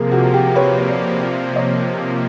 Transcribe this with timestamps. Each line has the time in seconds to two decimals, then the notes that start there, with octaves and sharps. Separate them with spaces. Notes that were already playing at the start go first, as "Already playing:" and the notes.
Already playing: C3 F3 A#3 G#4 A#4
0.12 F#4 G#4
0.34 G4
0.56 B4 C#5
0.79 C#5
0.89 C5 D5
1.22 C5 D5
1.56 C#5 D#5